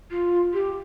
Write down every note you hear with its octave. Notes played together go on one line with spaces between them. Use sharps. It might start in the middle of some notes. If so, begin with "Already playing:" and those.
F4
G4